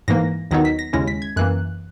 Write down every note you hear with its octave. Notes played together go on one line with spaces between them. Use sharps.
G#2 E3 A#3 A#6
D#2 D#3 F#3 B3 D#4 A#6
B6
A#6
D#2 C#3 G#3 C#4 E4 A#6
B6
G#6
F#2 E3 A#3 F#6